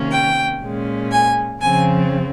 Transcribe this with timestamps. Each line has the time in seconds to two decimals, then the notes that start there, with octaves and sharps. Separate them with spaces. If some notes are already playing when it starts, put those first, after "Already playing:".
Already playing: C3 D#3 A#3 C#4
0.12 G5
0.62 A#2 G#3 C#4
1.11 G#5
1.61 F2 C#3 F3 C4 G#5